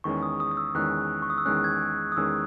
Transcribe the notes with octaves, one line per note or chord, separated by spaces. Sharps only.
E2 D#3 G#3 C#4 C#6
D#6
D#6
D#6
E6
E2 D#3 G#3 C#4 F#6
C#6
D#6
E6
E2 D#3 G#3 C#4 F#6
G#6
D#6
E2 D#3 G#3 C#4 E6